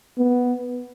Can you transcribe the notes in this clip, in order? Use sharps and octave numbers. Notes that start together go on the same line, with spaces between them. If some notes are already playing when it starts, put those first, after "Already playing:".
B3